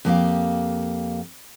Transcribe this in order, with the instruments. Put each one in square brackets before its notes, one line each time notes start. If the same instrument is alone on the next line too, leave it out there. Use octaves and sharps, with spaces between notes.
[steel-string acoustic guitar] F2 A#3 G4 F5